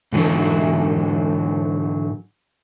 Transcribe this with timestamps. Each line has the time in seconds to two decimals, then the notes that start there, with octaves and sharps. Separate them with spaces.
0.12 G#2 D3 E3 F#3